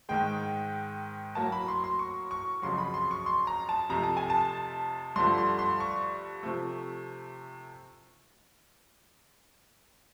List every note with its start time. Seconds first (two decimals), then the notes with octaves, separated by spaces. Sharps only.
0.09 G#2 D#3 G#3 G5
1.35 A2 F#3 A#3 A5
1.52 B5
1.68 C6
1.84 C6
1.99 C#6
2.31 C#6
2.62 F2 C#3 F#3 C6
2.78 B5
2.94 C6
3.11 C#6
3.26 C6
3.47 A#5
3.69 A5
3.89 F2 C3 F3 A3 A#5
4.03 A5
4.17 G#5
4.30 A5
5.16 G2 D3 F3 A3 C6
5.38 C6
5.59 C6
5.80 C#6
6.43 C3 F3 A3